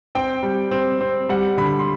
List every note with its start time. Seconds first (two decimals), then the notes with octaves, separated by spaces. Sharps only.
0.15 C4 G5
0.43 G3
0.71 C4
1.01 C4
1.29 G3 F#5
1.57 D3 B5
1.79 C6